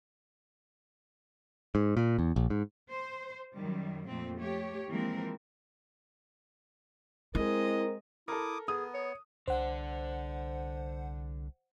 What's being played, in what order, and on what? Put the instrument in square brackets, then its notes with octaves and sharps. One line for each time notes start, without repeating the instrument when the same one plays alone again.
[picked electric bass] G#2
A#2
E2
A#1
G#2
[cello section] C5
F#2 D#3 G3
F2 A#2 A3 C4
A3 G4 C#5
E3 F3 G#3 A#3 C4 A#4
[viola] G#3 D#5 [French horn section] C4 A#4 [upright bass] E4
[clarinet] E4 [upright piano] A4 A#4 [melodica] D6 D#6
[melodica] B3 [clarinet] G#4 [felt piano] D#6
[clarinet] C#5
[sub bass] C2 [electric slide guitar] D3 D4 [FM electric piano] C5 F#5